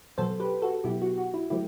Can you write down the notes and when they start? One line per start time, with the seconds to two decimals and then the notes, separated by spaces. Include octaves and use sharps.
0.18 B2 F#3 B3 A4 C5
0.40 G4 B4
0.62 F#4 A4
0.84 B2 F#3 B3 E4 G4
1.02 F#4
1.18 F#4
1.34 E4
1.50 D3 F#3 A3 C4 E4 G4